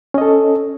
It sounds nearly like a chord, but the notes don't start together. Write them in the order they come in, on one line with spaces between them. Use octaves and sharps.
C#4 D#5 A4